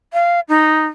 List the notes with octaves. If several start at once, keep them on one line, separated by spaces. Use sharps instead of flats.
F5
D#4